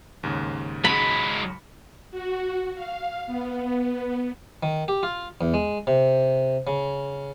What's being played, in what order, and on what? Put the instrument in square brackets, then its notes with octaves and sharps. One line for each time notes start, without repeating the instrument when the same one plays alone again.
[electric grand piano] D#2 G#2 C#3
[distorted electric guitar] F#3 G#3 [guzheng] B5
[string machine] F#4
F5
B3
[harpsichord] D#3
G4
F4
E2
G#3
C3
C#3